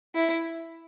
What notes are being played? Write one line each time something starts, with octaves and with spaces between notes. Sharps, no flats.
E4